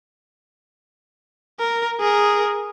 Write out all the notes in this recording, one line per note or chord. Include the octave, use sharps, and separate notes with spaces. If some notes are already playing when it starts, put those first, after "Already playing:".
A#4
G#4 A#4